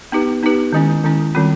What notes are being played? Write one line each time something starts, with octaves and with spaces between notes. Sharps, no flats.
B3 D#4 G4 B4
B3 D#4 G4 B4
D#3 G#3 C#4 E4
D#3 G#3 C#4 E4
D#3 G3 C4 F4